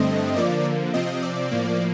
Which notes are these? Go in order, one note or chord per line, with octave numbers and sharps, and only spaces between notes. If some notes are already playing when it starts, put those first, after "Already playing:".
Already playing: G2 D3 A3 C4 D#5
D3 F3 A#3 D5
C3 F3 C4 D#5
D5
A2 F3 A#3